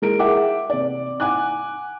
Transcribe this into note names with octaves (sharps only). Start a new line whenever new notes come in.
G#3 A#4 D7
G#4 E5 F#5 G5 D6
C3 D5
F#5 G#5 D6 F#6